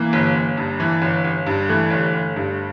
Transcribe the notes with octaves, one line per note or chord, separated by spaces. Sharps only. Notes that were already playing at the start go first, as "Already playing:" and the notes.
Already playing: E3 A#3
G1
G1
G2
E3
G1
G1
G2
E3 A3
G1
G1
G2